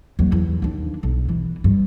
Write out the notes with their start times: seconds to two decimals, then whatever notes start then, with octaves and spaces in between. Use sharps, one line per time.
0.19 D#2 F#3
0.32 E2
0.62 D#2 D4
1.03 B1
1.29 E3
1.64 G2